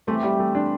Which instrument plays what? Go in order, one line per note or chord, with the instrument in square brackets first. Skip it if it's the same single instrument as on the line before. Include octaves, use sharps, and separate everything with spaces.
[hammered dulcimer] E3 C4 G4 C5 [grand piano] A3
[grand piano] G3
A3
D4